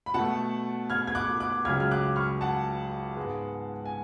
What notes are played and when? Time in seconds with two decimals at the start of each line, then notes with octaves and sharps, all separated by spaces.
0.06 B5
0.14 B2 A3 F#5 A5
0.90 F6 G#6
1.07 G#6
1.15 D6 F#6
1.40 D6 F#6
1.65 C#2 C#3 F#3 F6 G#6
1.80 F6
1.91 D6 F#6
2.16 C#6 F6
2.41 F#5 A5
3.16 G#2 G#3 B3
3.86 G#5